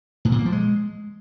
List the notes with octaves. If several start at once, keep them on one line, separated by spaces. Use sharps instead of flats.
A2
A#2
A#3
F3
G#3